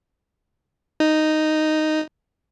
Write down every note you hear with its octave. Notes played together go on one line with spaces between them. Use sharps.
D#4